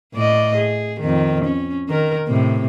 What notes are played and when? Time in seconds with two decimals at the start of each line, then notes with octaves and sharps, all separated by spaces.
0.14 A2 D5 D#5
0.56 G#4
1.00 F2 D#3
1.44 C#4
1.89 D#3 A#4
2.28 A2 C3